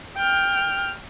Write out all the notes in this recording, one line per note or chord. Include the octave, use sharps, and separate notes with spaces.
G5 F6